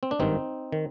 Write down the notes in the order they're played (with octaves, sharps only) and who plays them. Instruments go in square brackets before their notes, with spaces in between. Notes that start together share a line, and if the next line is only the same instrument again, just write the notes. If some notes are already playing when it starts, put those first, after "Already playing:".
[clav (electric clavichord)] C4
D4
G#1 G2 D#3 C4 D#4
D#3